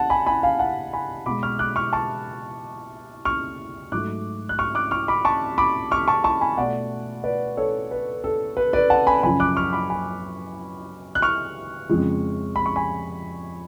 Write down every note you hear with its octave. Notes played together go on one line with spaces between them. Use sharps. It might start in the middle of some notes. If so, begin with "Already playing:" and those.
Already playing: F#5 A5
G#5 B5
G#5 B5
F5 G#5
F#5 A5
G#5 B5
B2 G#3 B5 D6
C#6 F6
D6 F#6
C#6 F6
A5 C#6
C#6 F6
G#2 F#3 A3 D6 F#6
F#6
C#6 F6
D6 F#6
C#6 F6
B5 D6
A5 C#6
B5 D6
C#6 F6
A5 C#6
A5 C#6
G#5 B5
B2 A3 D5 F#5
B4 D5
A4 C#5
B4
A4
B4
B4 D5
F#5 A5
G#5 B5
F#2 C#3 F3 G#5 B5
D6 F#6
C#6 F6
B5 D6
G#5 B5
F#6
C#6 F6
F2 C#3 F3 G#3
B5
C#6
G#5 B5